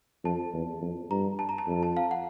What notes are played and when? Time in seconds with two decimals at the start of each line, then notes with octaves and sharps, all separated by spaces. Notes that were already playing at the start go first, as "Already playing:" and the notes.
0.24 F2 A5
0.54 E2
0.81 F2
1.11 G2 A#5
1.39 A5
1.49 A#5
1.58 A5
1.67 F2
1.83 A5
1.97 F5
2.11 F#5